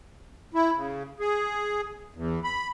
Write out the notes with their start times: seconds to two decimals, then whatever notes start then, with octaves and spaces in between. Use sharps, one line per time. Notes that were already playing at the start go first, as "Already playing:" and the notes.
0.54 E4
0.76 C#3
1.20 G#4
2.14 E2
2.44 B5